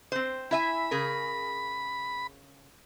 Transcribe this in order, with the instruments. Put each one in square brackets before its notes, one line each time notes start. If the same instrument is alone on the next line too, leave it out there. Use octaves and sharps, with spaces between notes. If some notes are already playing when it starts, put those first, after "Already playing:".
[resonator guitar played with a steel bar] C4 C5
[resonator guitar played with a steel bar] E4 E5 G#5 [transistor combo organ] B5
[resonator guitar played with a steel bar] C#3 G#4 A#4